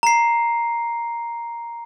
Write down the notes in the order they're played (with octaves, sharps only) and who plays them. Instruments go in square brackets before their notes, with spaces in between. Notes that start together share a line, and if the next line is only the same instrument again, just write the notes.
[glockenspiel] A#5 C7